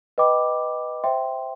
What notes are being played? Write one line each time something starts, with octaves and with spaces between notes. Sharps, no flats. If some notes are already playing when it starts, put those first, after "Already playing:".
B4 D#5 G5 B5 D6
C5 E5 G5 C6